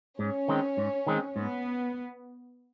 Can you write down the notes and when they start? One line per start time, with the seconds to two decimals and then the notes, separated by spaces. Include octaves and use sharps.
0.19 G#2 C#4
0.48 D#3 G#3 C4
0.77 G#2
1.07 D#3 G#3 C4
1.36 G#2 B3